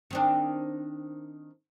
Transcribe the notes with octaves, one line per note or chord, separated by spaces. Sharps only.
D#3 C4 D4